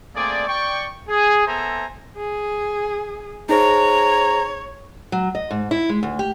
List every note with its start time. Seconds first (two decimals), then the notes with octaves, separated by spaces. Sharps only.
0.15 A3 A#3 C4 G#4 D5
0.47 D5 G5 C#6
1.08 G#4
1.46 B3 A4 C5 E5 G#5 A#5
2.16 G#4
3.49 D#4 G#4 C5 C#5 A#5
5.12 F#3
5.35 D#5
5.51 G#2
5.71 E4
5.89 G#3
6.03 D2
6.19 G4